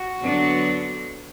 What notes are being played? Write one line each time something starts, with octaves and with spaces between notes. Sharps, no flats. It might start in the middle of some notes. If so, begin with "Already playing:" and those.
Already playing: F#4
D3 F#3 B3 D4